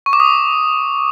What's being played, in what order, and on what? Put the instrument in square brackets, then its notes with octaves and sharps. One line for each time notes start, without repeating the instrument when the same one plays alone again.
[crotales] C#6
D6
D#6